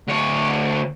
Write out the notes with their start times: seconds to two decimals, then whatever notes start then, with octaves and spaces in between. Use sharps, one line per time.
0.08 D2 C#5